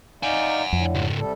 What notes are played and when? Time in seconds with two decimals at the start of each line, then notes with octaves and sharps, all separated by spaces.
0.23 D#4 D5 F5 F#5 G#5
0.73 F2 A2 D3
0.95 C#2 G#2
1.18 C3 G3 A4